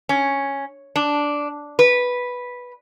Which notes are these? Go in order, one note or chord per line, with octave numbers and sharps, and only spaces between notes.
C#4
D4
B4